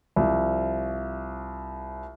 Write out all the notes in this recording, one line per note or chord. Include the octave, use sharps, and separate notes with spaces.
C2 F3